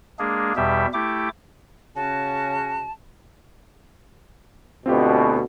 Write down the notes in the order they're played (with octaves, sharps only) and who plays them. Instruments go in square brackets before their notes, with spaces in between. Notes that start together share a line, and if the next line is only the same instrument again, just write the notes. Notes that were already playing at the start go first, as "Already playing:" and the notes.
[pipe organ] G#3 A#3 D4 G#4
E2 B2 G3 G4 E5
A3 E4 G4 D6
[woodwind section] C#3 C#4 F#4 [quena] A5
[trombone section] D2 B2 [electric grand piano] C4 F4 G4